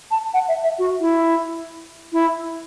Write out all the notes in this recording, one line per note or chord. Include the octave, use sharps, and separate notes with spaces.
A5
F#5
E5
E5
F#4
E4
E4